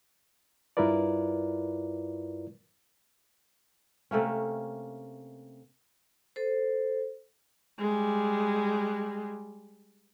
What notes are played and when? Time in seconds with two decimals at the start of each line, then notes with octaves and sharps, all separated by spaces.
0.77 G2 E4 F4 A#4 B4 D5
4.11 C3 A3 A#3 C#4
6.36 A4 C5
7.79 G3 G#3